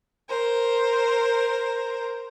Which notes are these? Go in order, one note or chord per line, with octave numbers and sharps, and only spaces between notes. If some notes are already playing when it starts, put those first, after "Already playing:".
A#4 C5